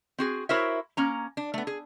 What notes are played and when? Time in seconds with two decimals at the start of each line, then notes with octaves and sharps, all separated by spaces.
0.18 C4 F#4 G#4
0.49 E4 F#4 A#4 C5 C#5 E5
0.97 A#3 C#4 A#5
1.37 D4
1.54 A3 B3
1.67 G#4